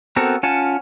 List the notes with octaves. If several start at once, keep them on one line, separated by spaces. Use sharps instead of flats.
B3 C4 F#4 A4 A#4
C#4 F4 F#5 G#5 A5